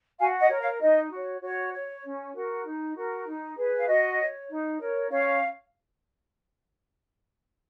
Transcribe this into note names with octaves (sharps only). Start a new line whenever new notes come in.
F#4 F5 G#5
D#5 F#5
A#4 C#5
C#5 F5
D#4 D#5
F#4 C#5
F#4 C#5
C#5
C#4
F#4 A#4
D#4
F#4 A#4
D#4
G#4 B4
F5
F#4 D#5
C#5
D#4
A#4 C#5
C#4 C#5 F5